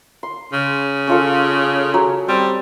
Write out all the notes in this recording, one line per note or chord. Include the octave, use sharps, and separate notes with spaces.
C6
C#3
C#4 F4 A4
F#3 G#5
G3 C4